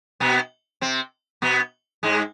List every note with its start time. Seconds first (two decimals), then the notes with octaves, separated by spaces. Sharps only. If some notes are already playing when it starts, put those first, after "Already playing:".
0.20 B2 B3
0.81 C3 C4
1.42 B2 B3
2.03 G#2 G#3